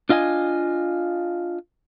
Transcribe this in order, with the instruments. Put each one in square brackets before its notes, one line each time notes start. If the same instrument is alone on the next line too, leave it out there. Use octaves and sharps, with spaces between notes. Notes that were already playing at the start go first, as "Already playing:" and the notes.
[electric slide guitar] D4 F4 D#5 F#5 G#5